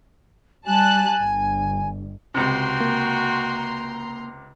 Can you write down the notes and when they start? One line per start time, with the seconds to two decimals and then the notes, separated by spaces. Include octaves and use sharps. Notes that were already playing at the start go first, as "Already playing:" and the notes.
0.66 G3 G#5 A5 F#6
1.21 G1
2.34 C#2 C3 F#4 G5 A#5 C6
2.80 A#3